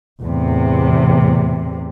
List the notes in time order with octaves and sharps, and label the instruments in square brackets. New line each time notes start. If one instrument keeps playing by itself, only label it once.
[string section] E2 A2 C3